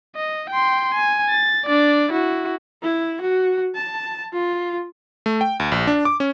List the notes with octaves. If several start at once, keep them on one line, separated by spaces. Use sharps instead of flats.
D#5
G5 C6
G#5
A6
D4 D5
E4 F#4
E4
F#4
A5
F4
A3
G5
D2
A#1
D4
D6
C#4